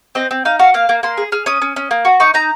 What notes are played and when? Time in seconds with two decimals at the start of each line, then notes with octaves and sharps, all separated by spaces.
0.15 C4 D#5
0.31 C4
0.45 D#4 F5
0.59 F#4 F5
0.74 A#3 F5
0.89 A#3
1.03 A#3 C6
1.17 G#4
1.32 G#4 F6
1.46 C#4 D#6
1.62 C#4
1.76 C#4
1.91 A#3
2.05 F#4
2.20 D#4 C#6
2.34 D#4 A#5